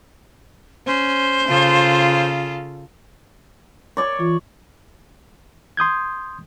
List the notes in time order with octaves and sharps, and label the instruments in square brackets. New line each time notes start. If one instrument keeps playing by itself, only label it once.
[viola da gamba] C#4 [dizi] C5
[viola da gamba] C#3 F4 A4
[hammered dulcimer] C#5 D5 C#6
[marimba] E3 F4 D6
[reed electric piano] C6 D#6 G6 G#6